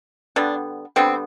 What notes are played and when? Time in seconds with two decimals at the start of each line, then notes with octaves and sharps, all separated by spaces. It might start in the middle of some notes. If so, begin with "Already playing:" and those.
0.36 D3 G3 B3 D4
0.96 D3 G3 B3 C4